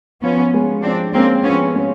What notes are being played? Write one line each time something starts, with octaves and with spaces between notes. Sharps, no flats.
F3 B3 C#4
G#3 C#4
F3 C4 D4
G#3 A#3 C4 C#4
F3 B3 C#4
G#3 C#4